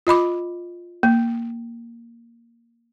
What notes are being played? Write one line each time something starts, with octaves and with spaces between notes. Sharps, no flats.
F4 D#5 B5 D6
A#3